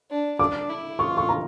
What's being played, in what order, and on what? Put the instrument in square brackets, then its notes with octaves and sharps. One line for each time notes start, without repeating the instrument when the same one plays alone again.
[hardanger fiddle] D4
[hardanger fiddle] D4 [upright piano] D6
[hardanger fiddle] E4
[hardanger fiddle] F4 [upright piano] C#6
[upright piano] C#6
A#5